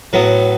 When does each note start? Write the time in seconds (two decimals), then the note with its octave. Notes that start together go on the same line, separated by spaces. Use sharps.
0.13 A2 F#3 B3